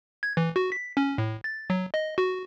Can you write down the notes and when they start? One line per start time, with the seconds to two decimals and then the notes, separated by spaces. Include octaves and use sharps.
0.23 G#6
0.37 E3
0.56 F#4
0.72 B6
0.97 C#4
1.18 A2
1.44 A6
1.70 F#3
1.94 D#5
2.18 F#4